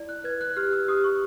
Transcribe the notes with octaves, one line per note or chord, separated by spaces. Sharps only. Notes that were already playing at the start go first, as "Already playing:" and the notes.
Already playing: E4 D5
F#6
B4 G#6
F#6
G4 F6
E6
G4 D#6
C#6